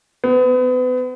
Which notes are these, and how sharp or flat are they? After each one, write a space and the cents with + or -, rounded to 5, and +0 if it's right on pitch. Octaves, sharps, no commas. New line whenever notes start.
B3 +35